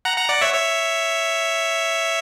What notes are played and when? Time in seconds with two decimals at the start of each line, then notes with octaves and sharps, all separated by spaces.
0.05 F#5 A#5
0.17 F#5 A#5
0.29 D5 F#5
0.41 C#5 E5
0.54 C#5 E5